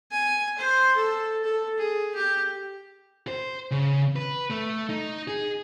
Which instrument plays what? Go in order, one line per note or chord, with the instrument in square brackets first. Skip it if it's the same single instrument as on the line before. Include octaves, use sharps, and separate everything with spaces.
[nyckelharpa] G#5
C5
A4
A4
G#4
G4
[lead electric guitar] C5
C#3
B4
A3
D#4
G#4